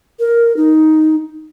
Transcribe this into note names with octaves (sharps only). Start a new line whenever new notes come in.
A#4
D#4